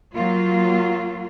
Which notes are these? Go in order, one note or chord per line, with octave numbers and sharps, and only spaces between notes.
F#3 A#3 F4